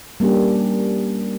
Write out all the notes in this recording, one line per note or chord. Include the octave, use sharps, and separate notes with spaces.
G3 A#3 C#4 D4 G4